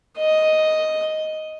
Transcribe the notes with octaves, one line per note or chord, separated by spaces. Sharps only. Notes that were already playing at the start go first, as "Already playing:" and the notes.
D#5